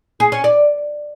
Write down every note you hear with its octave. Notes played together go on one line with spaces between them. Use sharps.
G#4
C#4
D5